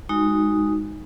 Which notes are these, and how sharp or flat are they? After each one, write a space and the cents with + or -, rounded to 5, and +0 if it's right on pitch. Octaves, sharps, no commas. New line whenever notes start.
G#3 -10 D#4 +0 F#4 +0